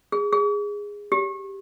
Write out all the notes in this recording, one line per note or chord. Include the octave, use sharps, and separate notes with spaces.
G#4
G#4
G4